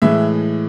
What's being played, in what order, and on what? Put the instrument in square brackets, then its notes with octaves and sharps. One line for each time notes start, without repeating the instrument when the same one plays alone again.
[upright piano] A2 E3 G#3 E5